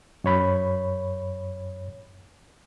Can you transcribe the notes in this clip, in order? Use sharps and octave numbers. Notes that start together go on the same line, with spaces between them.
F#2 C#5 B5